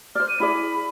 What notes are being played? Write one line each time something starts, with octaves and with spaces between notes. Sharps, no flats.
C5 D5 F6
D#7
E4 G#4 D5 B5